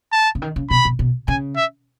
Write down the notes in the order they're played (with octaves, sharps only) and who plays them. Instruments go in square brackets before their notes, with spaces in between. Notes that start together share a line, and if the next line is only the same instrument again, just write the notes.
[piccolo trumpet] A5
[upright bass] C#3
D#3
C#3
[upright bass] B2 [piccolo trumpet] B5
[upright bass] B2
B2
[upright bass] C#3 [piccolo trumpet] G#5
[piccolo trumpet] E5